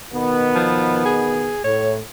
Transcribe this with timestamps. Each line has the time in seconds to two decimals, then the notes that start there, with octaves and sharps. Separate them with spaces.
0.14 B2 D#3 B3
0.55 F3
1.05 G#4
1.64 A2 C#5